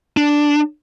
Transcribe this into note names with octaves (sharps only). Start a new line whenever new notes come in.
D4